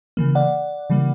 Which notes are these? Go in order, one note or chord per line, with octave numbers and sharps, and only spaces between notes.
C#3 E3 A#3
D5 F#5
C#3 E3 G3 A#3